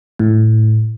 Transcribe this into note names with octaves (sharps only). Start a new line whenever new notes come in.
A2